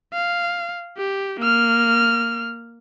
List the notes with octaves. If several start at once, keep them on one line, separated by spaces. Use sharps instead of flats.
F5
G4
A#3 F6